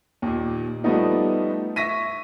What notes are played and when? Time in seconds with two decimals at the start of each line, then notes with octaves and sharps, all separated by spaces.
0.22 D#2 A#2
0.84 F3 G3 A3 B3 D#4
1.76 E5 C#6 A#6 B6 D#7